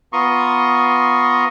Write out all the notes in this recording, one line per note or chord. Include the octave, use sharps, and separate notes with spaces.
B3 F4 A#5 C6 C#6 D#6